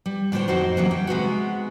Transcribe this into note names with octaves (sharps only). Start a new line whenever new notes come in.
G3
A2 D3 D4 G4 C5 C#5
F2 D#4 F#4 C5
A2 C#3 E3 F#3 G3 A#3
D#4 G5
C3 G#3 B3 F#4